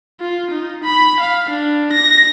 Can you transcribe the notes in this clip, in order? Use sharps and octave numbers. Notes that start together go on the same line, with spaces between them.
F4
D#4
B5
F5
D4
A#6